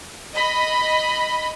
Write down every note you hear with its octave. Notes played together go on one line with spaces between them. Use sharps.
D#5 B5